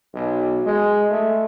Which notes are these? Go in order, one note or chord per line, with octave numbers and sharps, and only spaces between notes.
B1
G#3
A3